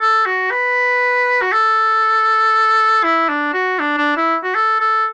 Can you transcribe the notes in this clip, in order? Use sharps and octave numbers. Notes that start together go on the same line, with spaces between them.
A4
F#4
B4
F#4
A4
E4
D4
F#4
D4
D4
E4
F#4
A4
A4